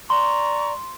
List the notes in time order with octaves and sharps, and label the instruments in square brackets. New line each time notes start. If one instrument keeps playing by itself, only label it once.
[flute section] D5 A#5 C#6 [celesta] C6